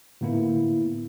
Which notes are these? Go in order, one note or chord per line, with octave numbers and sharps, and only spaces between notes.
A2 D3 A#3 B3 E4